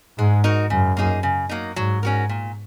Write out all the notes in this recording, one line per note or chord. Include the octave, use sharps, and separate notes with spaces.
G#2 G#3
D#4 F#4 A#4
F#2 C#3
A#3 D#4 G#4
C#3
F#3 A#3 D#4
G#2 F#3
C#4 F#4 A#4
A#2